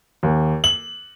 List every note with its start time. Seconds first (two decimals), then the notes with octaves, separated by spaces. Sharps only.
0.23 D#2
0.64 F#7